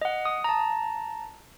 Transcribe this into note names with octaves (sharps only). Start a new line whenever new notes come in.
D#5 F#5
D#6
A5 A#5